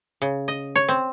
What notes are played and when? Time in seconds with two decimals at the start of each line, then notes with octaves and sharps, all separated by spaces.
0.22 C#3
0.48 D#5
0.76 C#5
0.89 C4